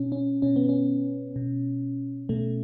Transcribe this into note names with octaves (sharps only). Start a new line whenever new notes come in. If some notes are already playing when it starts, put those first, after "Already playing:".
Already playing: B2 C#4
C#4
B2 C#4
B3
C#4
B2
B2 A3